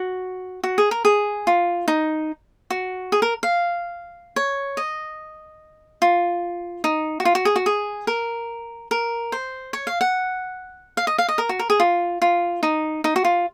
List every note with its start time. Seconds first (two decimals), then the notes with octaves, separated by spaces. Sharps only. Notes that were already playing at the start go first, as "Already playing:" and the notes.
Already playing: F#4
0.64 F#4
0.78 G#4
0.91 A#4
1.05 G#4
1.47 F4
1.88 D#4
2.70 F#4
3.12 G#4
3.22 A#4
3.43 F5
4.36 C#5
4.77 D#5
6.02 F4
6.84 D#4
7.20 F#4
7.25 F4
7.35 F#4
7.45 G#4
7.56 F#4
7.66 G#4
8.07 A#4
8.91 A#4
9.32 C5
9.73 C#5
9.87 F5
10.01 F#5
10.97 F5
11.07 D#5
11.18 F5
11.29 D#5
11.38 A#4
11.49 F#4
11.59 A#4
11.70 G#4
11.80 F4
12.22 F4
12.63 D#4
13.04 D#4
13.16 F#4
13.25 F4